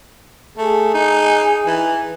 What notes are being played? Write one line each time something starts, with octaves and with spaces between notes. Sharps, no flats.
A3 G#4
D#4
E3